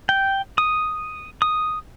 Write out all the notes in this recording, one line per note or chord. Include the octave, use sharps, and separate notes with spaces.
G5
D#6
D#6